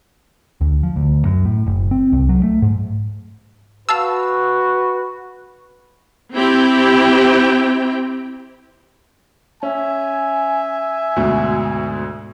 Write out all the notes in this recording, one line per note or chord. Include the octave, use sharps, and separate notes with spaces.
D2
F3
D2
F#2
A2
F#1
C4
C2
F#3
A3
G#2
F#4 B4 F5 A5 E6
C4 E4 G4 G5
C#4 E5 G#5
D2 G#2 B2